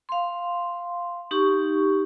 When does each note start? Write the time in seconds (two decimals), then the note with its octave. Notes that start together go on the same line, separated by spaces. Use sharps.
0.09 F5 C6
1.31 D#4 G4 C#6